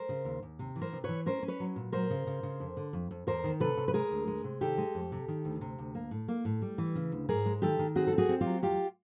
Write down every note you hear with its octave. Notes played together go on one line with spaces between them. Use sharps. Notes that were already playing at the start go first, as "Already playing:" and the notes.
Already playing: A#4 C5
C#3
D#2
D#2
C3
E3
A#4 C5
C3
E3 B4 C#5
C#4 A#4 C5
C#4
B4 C#5
F#3
A#2
F#3 A#4 C5
C#3
C#3
C#3
F2
D3
F2
F2
E2 A#4 C5
D#3
C3 A4 B4
C3
B4
G#3 G#4 A#4
D2
G#3
C3
D#3 G4 A4
G#3
F2
C3
D#3
D2
C3
D2
A#3
A2
A#3
A2
G3
E3
C#3
D2
G#2 G#4 A#4
G#3
D#3 G4 A4
D#3
C4 F#4 G#4
A4
C4
F#4 G#4
C4
F4 G4
F#3
E2 F4 G4